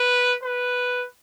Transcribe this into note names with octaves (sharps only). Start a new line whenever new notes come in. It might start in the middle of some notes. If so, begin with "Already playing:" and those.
Already playing: B4
B4